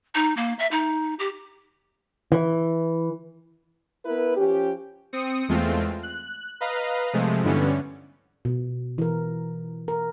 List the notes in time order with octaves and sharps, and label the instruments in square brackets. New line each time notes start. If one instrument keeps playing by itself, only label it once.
[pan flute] D#4
A#3
E5
D#4
G4
[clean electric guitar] E3
[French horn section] B3 E4 A#4 B4
F3 C#4 G4
[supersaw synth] C4 D#6 C#7
E2 G#3 A3 C4 F4
F#6
B4 D#5 F5 A#5
C3 F3 G#3 A3
G2 D3 E3 G3 B3 C#4
[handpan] B2
E3 A#4
A#4